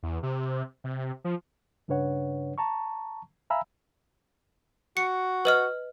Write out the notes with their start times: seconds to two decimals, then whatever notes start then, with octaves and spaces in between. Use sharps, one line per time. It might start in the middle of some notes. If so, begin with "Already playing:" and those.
0.03 E2
0.23 C3
0.84 C3
1.24 F3
1.88 G2 C#3 D4 B4 C#5 F#5
2.58 A5 A#5 C#6
3.50 E5 F5 G#5 A#5 B5 E6
4.97 F#4 C#7
5.45 B4 D#5 F6